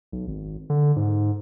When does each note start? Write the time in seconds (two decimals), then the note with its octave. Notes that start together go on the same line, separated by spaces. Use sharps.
0.12 B1
0.27 G#1
0.70 D3
0.96 G#2